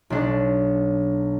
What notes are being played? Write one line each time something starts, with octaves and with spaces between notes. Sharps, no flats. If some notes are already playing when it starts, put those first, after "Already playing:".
B1 D4